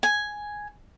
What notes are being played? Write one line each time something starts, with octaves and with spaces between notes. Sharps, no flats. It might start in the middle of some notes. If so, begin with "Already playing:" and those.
G#5